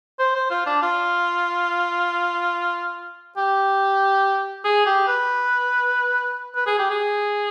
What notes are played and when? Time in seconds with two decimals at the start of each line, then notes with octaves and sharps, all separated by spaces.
0.19 C5
0.35 C5
0.50 F4
0.66 D4
0.82 F4
3.37 G4
4.64 G#4
4.86 G4
5.07 B4
6.55 B4
6.67 G#4
6.79 G4
6.90 G#4